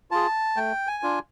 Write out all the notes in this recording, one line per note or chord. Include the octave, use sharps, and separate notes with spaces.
F4 G#4 A5
A3 G5
G#5
D4 F4